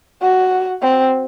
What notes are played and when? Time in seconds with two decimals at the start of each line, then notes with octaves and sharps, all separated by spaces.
0.22 F#4
0.82 C4